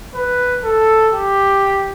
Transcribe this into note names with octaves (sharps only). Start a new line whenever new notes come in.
B4
A4
G4